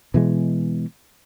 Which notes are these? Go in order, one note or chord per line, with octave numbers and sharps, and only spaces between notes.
B2 E3 G#3